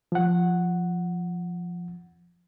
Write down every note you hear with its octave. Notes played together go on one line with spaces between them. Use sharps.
F3 F#5